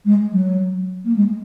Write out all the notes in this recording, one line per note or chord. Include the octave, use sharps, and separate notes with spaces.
G#3
F#3
A#3
G#3